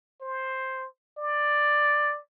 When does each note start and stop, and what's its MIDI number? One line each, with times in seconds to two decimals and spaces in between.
0.21 0.87 72
1.18 2.19 74